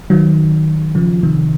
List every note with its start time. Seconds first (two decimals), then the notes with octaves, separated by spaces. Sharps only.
0.10 D#3 F#3
0.95 C#3 F3
1.23 C3 D#3